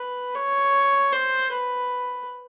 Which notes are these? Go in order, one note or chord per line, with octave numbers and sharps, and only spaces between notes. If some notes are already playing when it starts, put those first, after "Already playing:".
Already playing: B4
C#5
C5
B4